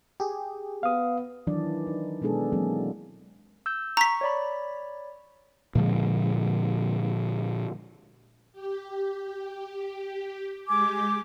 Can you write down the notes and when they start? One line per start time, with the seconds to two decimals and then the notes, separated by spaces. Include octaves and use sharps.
0.20 G4 G#4
0.83 B3 F5 D#6
1.47 D#3 E3 F#3 D4 D5
1.87 D#4
2.22 B2 G#3 B3 D4 G#4 A4
2.52 E3 F#3 G#3 A#3 C4 G#4
3.66 E6 G6
3.97 A#5 C#6 B6
4.21 C#5 D5 B5
5.75 A#2 D3 F3 G#3
8.52 G4
10.68 G#3 G4 G#5 D6